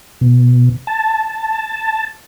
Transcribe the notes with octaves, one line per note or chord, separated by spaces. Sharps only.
B2
A5